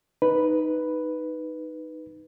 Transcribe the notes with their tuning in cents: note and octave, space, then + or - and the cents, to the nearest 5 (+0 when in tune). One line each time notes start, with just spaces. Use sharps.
D#4 +0 B4 +0